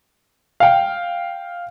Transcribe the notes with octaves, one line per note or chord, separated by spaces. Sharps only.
F5 G5